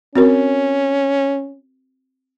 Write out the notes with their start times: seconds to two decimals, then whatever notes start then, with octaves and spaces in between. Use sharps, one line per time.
0.16 C4 C#4 F#4 A#4